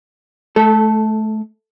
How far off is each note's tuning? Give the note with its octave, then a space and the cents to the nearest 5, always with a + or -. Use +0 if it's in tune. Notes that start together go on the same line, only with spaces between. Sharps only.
A3 -25 A4 +0